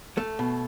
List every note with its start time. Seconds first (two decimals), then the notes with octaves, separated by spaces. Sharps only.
0.17 A3
0.39 B2